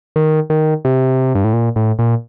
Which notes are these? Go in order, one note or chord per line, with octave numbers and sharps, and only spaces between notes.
D#3
D#3
C3
G2
A2
A#2
A2
A#2